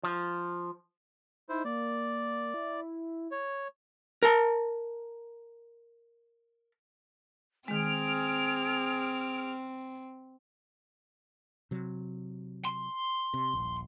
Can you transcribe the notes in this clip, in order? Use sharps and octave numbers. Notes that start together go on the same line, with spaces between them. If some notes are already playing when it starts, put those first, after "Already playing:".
F3
D#4 E4 C5
A#3 D5
E4
C#5
A#4 A5
D#3 G#3 C4 G#4 F6 D7
C3 F#3
C6
C3
D#1 A#1